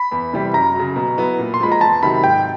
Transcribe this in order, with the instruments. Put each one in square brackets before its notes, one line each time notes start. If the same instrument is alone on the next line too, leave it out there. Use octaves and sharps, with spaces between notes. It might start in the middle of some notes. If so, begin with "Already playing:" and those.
Already playing: [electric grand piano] B5
[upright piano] E2
C3 E3 G3
[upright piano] F#2 [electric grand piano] A#5
[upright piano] C#3 F#3
B2
F#3 B3 E4
A#2
[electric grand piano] C6
[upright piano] F3 G#3 [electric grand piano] B5
[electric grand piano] A#5
[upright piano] E2 [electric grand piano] A5
[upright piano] C3 D#3 F#3 [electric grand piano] B5
[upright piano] G#2 [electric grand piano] G5